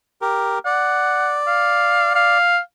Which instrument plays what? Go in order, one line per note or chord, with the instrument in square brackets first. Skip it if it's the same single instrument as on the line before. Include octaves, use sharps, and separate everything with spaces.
[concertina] G4 A#4
[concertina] D5 [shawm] F#5
[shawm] F5
F5